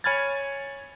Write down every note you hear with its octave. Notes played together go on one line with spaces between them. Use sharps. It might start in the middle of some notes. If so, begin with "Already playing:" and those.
C#5 G#5 B5 F6 G#6 A6